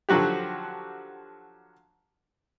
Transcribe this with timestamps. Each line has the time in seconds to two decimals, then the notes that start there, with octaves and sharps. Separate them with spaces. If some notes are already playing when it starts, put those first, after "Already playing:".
0.09 D3 F3 F#3 F#4 G4